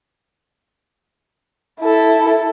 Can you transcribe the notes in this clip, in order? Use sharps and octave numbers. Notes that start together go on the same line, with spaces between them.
E4 A4